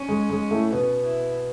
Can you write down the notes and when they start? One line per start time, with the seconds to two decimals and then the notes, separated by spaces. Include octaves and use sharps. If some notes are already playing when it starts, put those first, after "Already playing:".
Already playing: C#4
0.09 G#3
0.30 G#3
0.51 A2 A3
0.71 B2 B3 C#4
1.03 E4